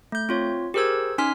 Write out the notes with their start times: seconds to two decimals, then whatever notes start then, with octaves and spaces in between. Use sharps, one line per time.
0.12 A3 G6
0.29 C4 F4 C#5
0.74 G4 G#4 A#4 C5 E6 G#6
1.18 C#4 D#4 G#5 C6 F6 B6